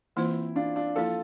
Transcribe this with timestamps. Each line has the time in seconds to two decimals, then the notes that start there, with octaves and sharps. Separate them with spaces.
0.16 E3 A#3 C4 E4 F4 C5
0.56 D4 F4
0.76 D4 F4
0.96 F3 A#3 E4 F4 A4